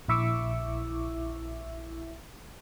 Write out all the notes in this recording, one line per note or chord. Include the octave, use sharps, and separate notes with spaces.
A#1 E4 E5 C#6 D6 E6